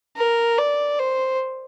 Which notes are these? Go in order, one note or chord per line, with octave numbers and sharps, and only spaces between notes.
A#4
D5
C5